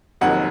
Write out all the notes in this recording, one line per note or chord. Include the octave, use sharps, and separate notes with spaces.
F1 F2 D#3 F#3 A#3 F#5